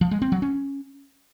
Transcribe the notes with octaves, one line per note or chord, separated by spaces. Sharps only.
F3
G#3
C4
F#3
C#4